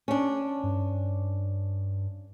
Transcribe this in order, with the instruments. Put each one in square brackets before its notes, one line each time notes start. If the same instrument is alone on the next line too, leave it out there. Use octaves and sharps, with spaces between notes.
[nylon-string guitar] C#4 D4
[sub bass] G2